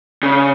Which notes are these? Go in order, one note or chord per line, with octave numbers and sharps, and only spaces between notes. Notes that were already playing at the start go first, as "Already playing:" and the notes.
C#3